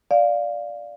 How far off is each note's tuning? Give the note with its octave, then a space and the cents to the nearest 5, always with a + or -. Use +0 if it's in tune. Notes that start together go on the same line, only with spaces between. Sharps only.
D5 +0 F5 +0